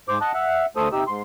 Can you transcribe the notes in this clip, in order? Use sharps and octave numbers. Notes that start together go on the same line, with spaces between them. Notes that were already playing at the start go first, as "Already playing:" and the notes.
G#2 C5 D6
D#5 F#5 A5
E5 F#5
D2 A3 A4 C5 D#6
C3 D#4 G4 E6
G#2 C6